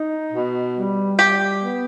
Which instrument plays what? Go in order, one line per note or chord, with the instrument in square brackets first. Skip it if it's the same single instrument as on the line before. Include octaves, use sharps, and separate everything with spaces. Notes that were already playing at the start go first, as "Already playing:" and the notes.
Already playing: [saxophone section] D#4
B2
G3
[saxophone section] G3 [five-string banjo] G4
[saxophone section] B3